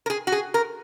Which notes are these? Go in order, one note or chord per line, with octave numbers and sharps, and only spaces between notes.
A#4
G#4
F#4
G#4
A#4